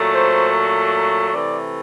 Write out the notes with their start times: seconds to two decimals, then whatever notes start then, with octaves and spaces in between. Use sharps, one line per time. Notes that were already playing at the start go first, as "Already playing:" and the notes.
Already playing: A#2 F#3 A3
0.13 C5
1.33 C3 E3 A3 D5